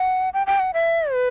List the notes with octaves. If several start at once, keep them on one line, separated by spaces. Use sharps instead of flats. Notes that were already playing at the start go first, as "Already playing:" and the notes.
Already playing: F#5
G5
G5
F#5
E5
B4